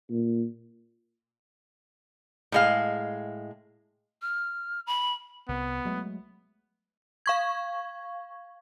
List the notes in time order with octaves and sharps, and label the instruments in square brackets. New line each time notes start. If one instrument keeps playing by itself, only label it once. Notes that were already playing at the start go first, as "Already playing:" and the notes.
[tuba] A#2
[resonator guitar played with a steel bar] A2 G#3 F5
[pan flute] F6
B5
[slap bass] C2 [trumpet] B3
[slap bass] F#3 G#3 A3
[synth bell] F5 C#6 G#6